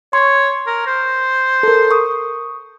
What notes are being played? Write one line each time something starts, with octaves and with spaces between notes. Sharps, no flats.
C#5 C6 C#6
A#4
C5
A4 A#4
C#6 D#6